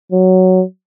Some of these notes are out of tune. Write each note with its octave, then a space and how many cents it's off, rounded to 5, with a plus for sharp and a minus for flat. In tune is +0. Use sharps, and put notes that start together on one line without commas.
F#3 +5